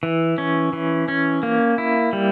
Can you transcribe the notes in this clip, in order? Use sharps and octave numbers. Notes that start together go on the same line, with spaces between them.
E3
C#4
E3
C#4
A#3
E4
G3